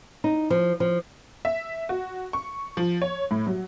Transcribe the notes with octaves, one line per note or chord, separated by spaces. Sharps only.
D#4
F3
F3
E5
F#4
C#6
F3
C#5
A2
F#3